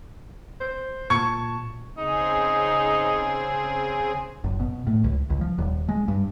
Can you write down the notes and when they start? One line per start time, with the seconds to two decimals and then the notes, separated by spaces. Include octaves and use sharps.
0.61 C5
1.10 A#2 A5 C#6 G#6 C#7
1.98 C#3 C4 D#4 G#4
4.44 F#1
4.60 B2
4.87 A2
5.04 C#2
5.30 C#2
5.41 F3
5.58 D#1
5.88 G#3
6.08 G2